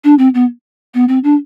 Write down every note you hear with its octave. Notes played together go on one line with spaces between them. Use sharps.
D4
C4
B3
B3
C4
D4